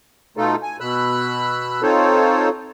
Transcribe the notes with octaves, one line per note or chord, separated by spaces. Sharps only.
B2 A3 D#4 F4 A4
G#5
B2 B5 E6 F#6
C4 D#4 F4 A4 C5 C#5